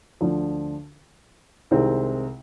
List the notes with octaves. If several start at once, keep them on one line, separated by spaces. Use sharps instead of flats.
D2 D3 F3
C2 C3 D#3 G#3 C4